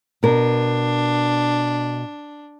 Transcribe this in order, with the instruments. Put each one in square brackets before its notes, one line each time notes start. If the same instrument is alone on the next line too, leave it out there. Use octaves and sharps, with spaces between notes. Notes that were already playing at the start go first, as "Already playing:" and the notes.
[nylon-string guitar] B2 A#4 [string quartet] D4